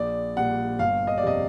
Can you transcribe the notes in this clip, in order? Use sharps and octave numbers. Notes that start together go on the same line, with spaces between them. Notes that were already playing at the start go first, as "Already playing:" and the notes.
Already playing: A#1 D5
A#2 G3 F#5
G1 F5
D#5
D5
F2 C3 D#5